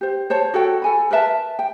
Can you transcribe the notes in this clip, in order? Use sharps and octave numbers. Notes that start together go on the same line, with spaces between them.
G4 C5
C5 C#5 A5
F#4 A4 C#5 G5
A4 G#5 B5
A#4 B4 E5 A5
G5